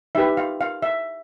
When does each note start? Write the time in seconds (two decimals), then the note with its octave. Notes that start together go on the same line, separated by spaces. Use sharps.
0.15 D#4 G4 B4 E5
0.37 F5
0.61 F5
0.82 E5